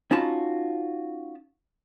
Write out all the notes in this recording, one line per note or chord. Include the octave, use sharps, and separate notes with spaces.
C#4 D#4 F4 F#4 A5 B5